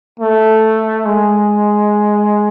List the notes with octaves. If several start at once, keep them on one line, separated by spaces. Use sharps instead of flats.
A3
G#3